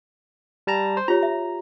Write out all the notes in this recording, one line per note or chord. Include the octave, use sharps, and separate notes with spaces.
G3 A5 A#5
C5
F4 G4 C#5 A#5
E5